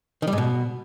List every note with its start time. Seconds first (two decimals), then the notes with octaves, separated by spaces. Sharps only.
0.22 D#3
0.27 G3
0.33 G#2
0.38 B2